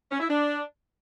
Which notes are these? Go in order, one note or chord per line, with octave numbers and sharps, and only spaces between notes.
C#4
E4
D4